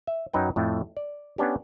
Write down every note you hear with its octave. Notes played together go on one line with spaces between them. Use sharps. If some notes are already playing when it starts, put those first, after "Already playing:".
E5
F#2 F#3 D#4 B4 G5
F2 A2 A3
D5
B3 C#4 D4 G4